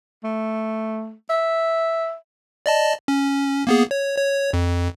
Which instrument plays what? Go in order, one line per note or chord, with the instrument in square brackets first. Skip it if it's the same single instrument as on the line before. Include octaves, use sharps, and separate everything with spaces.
[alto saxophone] A3
E5
[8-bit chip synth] D5 D#5 A5
C#4
A#3 B3 G#4
C#5
C#5
F2